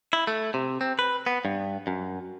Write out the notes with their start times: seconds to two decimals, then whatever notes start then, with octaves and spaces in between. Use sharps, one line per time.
0.13 E4
0.27 A3
0.54 C3
0.81 C4
0.99 B4
1.27 B3
1.45 G2
1.87 F#2